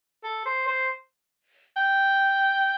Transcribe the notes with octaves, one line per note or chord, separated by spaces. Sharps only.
A4
C5
C5
G5